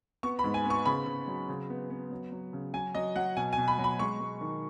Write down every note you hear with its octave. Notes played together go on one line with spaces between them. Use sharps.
B3 C#6
B5
G#2
G#5
B3 C#6
C#3 B5
C#3
F#3
C#3
B3
B3
F#3
F#3
C#3
F#3 G#5
F#3 D#5
F#3 F#5
B2 G#5
G#5
B2
B5
F#3
B5
G#3 C#6
G#3
D#3